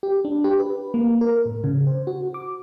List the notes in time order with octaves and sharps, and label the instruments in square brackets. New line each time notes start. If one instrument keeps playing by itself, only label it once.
[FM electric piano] G4
D4
G4
B4
A#3
A#4
A2
C#3
C5
F#4
D6